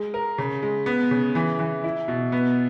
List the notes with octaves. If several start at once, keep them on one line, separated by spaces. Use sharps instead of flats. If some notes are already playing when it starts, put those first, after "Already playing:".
Already playing: G#3
A#4
C#3
G#3
B3
C#3
E3
E3
E4
B2
B3